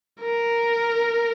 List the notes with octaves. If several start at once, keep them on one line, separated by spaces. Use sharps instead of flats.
A#4